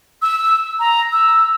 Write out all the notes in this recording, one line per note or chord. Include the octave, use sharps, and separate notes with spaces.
E6
A#5
E6